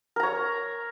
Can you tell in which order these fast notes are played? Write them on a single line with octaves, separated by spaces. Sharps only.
A#4 A#5 C#5